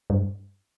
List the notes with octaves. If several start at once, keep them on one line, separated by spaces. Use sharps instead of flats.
G2